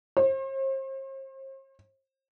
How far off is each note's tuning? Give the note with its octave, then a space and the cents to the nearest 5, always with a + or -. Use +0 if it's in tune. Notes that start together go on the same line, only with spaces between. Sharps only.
C5 +40